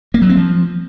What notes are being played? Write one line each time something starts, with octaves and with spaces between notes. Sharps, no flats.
A#3
F#3
C4
F3